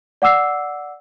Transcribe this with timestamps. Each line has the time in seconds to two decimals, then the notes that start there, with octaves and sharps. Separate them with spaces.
0.22 D5 F#5 D6 E6 C7